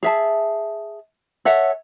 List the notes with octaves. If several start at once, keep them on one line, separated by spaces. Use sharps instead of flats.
G#4 E5 A5
A4 C#5 E5 F#5